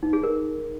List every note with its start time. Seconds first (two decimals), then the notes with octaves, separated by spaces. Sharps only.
0.03 D#4
0.13 G#4
0.23 A#4